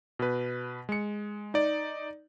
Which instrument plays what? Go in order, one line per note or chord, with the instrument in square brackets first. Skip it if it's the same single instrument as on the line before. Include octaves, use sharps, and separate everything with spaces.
[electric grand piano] B2 B4
G#3 C#7
D#4 D5